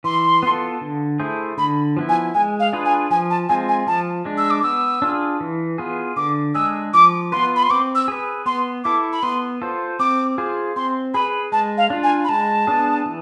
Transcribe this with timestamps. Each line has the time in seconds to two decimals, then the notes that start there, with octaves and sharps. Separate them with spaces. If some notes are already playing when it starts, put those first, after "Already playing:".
0.04 E3 C6
0.43 B3 F4 A4
0.81 D3
1.19 A3 E4 G#4 C5
1.57 D3 B5
1.97 F3 B3 E4
2.09 G#5
2.34 G#3 G#5
2.60 F5
2.73 D4 F4 G#4 B4
2.85 G#5
3.10 F3 G#5
3.30 A5
3.49 G#3 C4 F4 G#5
3.69 G#5
3.87 F3 A5
4.25 G#3 D4
4.38 E6
4.51 D6
4.63 B3 E6
5.02 D4 F4 G#4
5.40 E3
5.78 B3 F4 G#4
6.16 D3 D6
6.55 G#3 D4 G#4 E6
6.94 F3 D6
7.32 B3 F4 B4 C6
7.56 B5
7.63 C6
7.70 C4 D6
7.95 E6
8.08 G#4 B4
8.46 B3 C6
8.84 E4 A4 D6
9.13 B5
9.23 B3 C6
9.62 F4 A4 C5
9.99 C4 D6
10.38 F4 G#4 C5
10.76 C4 C6
11.14 G#4 B4 B5
11.52 G#3 A5
11.78 F5
11.90 D4 F4
12.03 G#5
12.24 B5
12.29 G#3 A5
12.67 B3 D4 G#4
13.06 E3